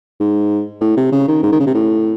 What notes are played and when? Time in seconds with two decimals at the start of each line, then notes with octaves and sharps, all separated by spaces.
0.20 G#2
0.81 A2
0.97 C3
1.12 C#3
1.28 D#3
1.43 G#2
1.52 D#3
1.59 C#3
1.67 C3
1.74 A2